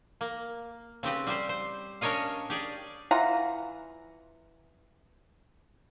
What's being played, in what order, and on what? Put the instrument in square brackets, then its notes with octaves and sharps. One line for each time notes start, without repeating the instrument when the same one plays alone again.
[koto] A#3
C#3 C4 G4 B4
G3 G4 C5
C5
C#4 D4 A#4 C#5 D#5 F5
G4 G#4 D5
[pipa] E3 F4 F#5 A#5